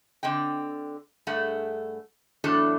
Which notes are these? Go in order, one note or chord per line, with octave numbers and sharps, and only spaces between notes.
D3 C4 D#5 G5
G2 A3 G#4 F#5
E2 A2 F#3 D4 A4